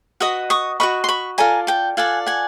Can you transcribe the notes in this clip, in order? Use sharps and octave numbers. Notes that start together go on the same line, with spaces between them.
F#4 B4 D#5 C#6 D#6
C#6 D#6
F#4 B4 D#5 B5 C#6
C6
B5 C#6
F4 A4 D5 G#5 A#5
G5 A5
F4 A4 D5 F#5 G#5
F#5 G#5